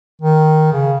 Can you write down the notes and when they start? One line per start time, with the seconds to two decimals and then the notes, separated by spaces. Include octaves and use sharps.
0.21 D#3
0.73 C#3